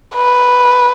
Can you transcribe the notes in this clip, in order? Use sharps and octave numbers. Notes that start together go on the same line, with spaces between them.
B4